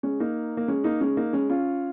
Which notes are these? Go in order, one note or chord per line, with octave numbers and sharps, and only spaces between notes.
G#3 C#4
A#3 D#4
A#3
G#3 C#4
A#3 D#4
G#3 C#4
A#3 D#4
G#3 C#4
C#4 F4